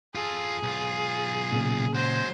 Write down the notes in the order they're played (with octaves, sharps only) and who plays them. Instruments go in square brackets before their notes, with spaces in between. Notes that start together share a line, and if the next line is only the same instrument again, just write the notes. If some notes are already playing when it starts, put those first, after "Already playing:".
[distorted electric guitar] F4 A4 [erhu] G#4
[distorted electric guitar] B1 F4
[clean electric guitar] A#2 C#3
[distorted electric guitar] F#3 G#3 [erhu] C5